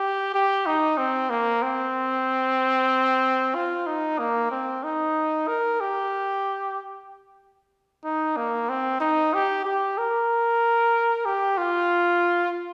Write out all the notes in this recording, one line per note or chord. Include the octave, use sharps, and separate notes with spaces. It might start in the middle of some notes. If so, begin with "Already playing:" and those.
Already playing: G4
G4
D#4
C4
A#3
C4
F4
D#4
A#3
C4
D#4
A#4
G4
D#4
A#3
C4
D#4
G4
G4
A#4
G4
F4